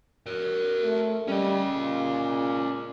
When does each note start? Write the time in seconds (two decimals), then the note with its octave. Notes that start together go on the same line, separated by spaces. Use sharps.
0.27 A#4 C#5
0.83 A3
1.28 G3 C#4 D#5
1.72 A#2